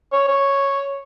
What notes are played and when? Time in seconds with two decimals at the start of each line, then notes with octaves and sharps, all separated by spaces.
0.13 C#5
0.28 C#5